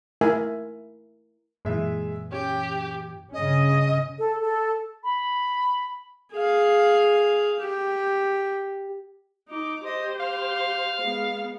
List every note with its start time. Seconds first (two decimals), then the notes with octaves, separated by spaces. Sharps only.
0.21 A3 E4 A#4 E5 G#5
1.65 F#2 A#2 E3 G#3 E5
2.32 C#4 G4
3.33 G2 C#3 C#4 D#5
4.18 A4
4.41 A4
5.04 B5
6.33 G#4 F5
7.59 G4
9.49 D#4 D6
9.85 G4 C5 D#5
10.20 F5
11.02 G#3 B3